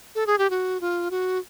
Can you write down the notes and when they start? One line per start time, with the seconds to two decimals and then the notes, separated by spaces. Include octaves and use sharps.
0.15 A4
0.27 G#4
0.38 G4
0.50 F#4
0.81 F4
1.11 F#4